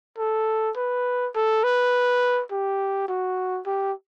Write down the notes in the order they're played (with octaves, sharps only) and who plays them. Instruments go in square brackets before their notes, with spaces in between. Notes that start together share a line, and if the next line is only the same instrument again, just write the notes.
[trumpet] A4
B4
A4
B4
G4
F#4
G4